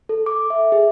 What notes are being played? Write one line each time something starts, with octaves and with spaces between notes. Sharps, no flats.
A4
D6
E5
G#4